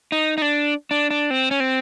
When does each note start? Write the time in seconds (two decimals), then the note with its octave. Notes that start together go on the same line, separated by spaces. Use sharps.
0.12 D#4
0.38 D#4
0.42 D4
0.91 D4
1.11 D4
1.30 C4
1.51 C#4
1.60 C4